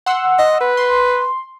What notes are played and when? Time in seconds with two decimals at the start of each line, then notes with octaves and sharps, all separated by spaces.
0.06 F#5 C6 E6
0.39 D#5
0.61 B4
0.77 C6